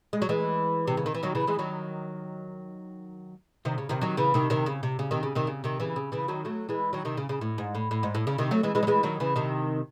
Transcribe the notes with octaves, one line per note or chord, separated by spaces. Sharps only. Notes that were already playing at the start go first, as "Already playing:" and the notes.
G#3
F#3
E3 G#3
C3
C#3
D#3
E3
D#3 F#3
C#3 E3
E3 G#3
D#3 F#3
C3 D#3
C#3
C3 D#3
D#3 F#3
C#3 E3
C3 D#3
C3 D#3
C#3
C3
C#3
C3 D#3
C#3
C3 D#3
C#3
C3 D#3
C#3 E3
C#3
C#3 E3
D#3 F#3
F#3 A3
E3 G#3
D#3 F#3
C3 D#3
C#3
C#3
A2
G#2
A2
A2
G#2
A2
C#3
C3 D#3
F#3 A3
E3 G#3
E3 G#3
F#3
E3 G#3
D#3 F#3
C#3 E3
C3 D#3